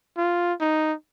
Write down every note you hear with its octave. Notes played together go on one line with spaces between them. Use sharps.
F4
D#4